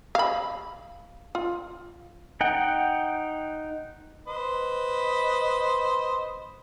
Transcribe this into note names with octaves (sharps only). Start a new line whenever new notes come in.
F5 B5
F4
D#4 F#5 G5
B4 C5 D#5